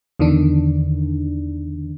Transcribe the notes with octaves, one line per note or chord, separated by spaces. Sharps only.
E2 D3 D#3 D4